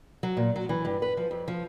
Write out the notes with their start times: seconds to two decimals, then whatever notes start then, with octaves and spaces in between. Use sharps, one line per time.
0.23 F#3
0.37 A#2
0.56 F#3
0.69 E3
0.85 G2
1.02 B4
1.17 F3
1.31 F2
1.48 F3